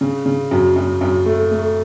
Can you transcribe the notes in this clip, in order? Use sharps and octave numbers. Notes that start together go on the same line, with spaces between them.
C#3
C#3
F#2
F#2
F#2
A3
A3